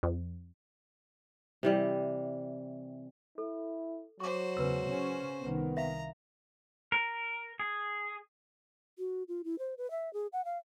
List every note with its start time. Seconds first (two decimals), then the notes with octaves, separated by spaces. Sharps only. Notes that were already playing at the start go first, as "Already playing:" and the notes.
0.03 F2
1.63 C3 E3 G3
3.38 E4 A4
4.20 F#3 F#4 C5 C#6 D6
4.57 E2 C#3 B4 E6
4.86 C#3 C#4
5.41 C2 D#3 B3
5.77 E5 F5 A#5
6.92 A#4
7.60 G#4
8.99 F#4
9.28 F4
9.44 E4
9.59 C5
9.78 B4
9.91 E5
10.13 G#4
10.33 F#5
10.45 F5